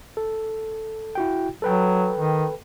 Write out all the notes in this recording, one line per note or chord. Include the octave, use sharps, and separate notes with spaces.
A4
E4 F#4 G5
F#3 A4 B4 G5
D#3